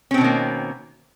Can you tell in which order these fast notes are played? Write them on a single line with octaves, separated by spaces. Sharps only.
C#4 C4 B2 D#3 A#3